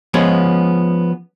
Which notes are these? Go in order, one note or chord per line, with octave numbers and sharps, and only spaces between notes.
F3 G#3 B3 C#4